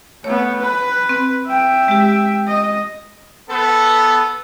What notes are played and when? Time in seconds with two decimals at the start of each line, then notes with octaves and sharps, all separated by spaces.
0.24 A3 B3 C#5
0.61 B4
1.09 C4
1.46 E5 G5
1.88 G#3 G4
2.48 D#5
3.49 B3 A4